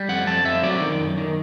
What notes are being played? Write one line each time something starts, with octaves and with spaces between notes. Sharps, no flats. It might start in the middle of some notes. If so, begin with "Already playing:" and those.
Already playing: G3
F2 F#5
F2 A5
F2 E5
F#3 D5
D#3
F#2
D#3